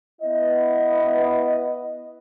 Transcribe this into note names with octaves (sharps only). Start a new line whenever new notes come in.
B3 E4 D#5